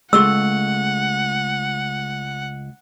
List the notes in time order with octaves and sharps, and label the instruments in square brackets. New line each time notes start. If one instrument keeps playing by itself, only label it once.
[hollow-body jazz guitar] C#2 A3 C6 [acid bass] G#3 [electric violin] F#5 [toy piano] E6